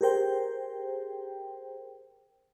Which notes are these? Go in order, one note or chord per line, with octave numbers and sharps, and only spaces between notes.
G4 G#4 A#4 C5 G5